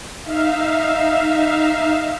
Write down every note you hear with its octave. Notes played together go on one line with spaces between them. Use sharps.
D#4 E5 F5